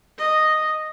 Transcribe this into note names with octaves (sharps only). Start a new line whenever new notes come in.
D#5